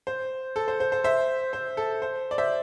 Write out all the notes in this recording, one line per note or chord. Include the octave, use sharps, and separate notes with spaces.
C5
A4
C5
C5
C5
C5 E5
C5
A4
C5
D5
C5 E5